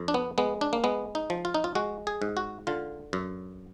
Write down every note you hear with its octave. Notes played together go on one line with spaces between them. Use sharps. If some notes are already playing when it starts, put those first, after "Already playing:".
Already playing: F2
D4
B3
G#3 B3
D4
A#3
G#3 B3
D#4
F3
F4
D#4
F4
G#3 F#4
G#4
G#2
F#4
D3 F4
F#2